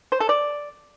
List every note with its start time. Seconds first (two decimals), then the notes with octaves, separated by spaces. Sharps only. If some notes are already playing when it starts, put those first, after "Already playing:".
0.12 C5
0.20 A4
0.29 D5